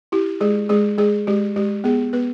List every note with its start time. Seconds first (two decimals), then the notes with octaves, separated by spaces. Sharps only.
0.12 E4 G4
0.41 G#3 G#4
0.69 G#3 G#4
0.98 G#3 G#4
1.27 G#3 G4
1.56 G#3 G4
1.84 B3 G#4
2.13 B3 B4